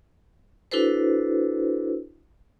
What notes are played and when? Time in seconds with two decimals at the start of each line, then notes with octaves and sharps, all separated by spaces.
0.71 D4 E4 F#4 A4 B4 C5